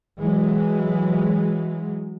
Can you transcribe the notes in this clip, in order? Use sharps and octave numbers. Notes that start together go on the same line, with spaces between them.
E3 F#3 G#3